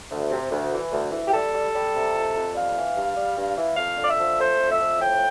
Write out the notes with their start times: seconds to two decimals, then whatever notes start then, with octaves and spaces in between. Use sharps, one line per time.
0.10 D2
0.30 C3
0.51 D2
0.72 E3
0.92 D2
1.12 E3
1.27 G4
1.32 G3 A4
1.53 G3
1.73 G3
1.94 C3
2.14 F2
2.34 F2
2.54 G3 F5
2.75 E3
2.96 G2
3.16 G3
3.36 G2
3.57 E3
3.77 F2 F5
3.97 D3
4.02 D5
4.07 E5
4.17 F3
4.38 A3 C5
4.58 F2
4.69 E5
4.79 F3
4.99 A2 G5